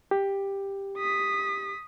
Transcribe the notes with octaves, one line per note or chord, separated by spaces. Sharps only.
G4
D#6 B6